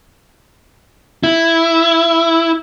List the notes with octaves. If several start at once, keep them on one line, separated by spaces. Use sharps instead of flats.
E4